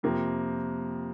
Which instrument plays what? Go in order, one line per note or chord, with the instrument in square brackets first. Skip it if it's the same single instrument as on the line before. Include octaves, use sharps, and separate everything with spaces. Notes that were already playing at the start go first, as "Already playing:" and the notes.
[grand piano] F2 C3 F3 A#3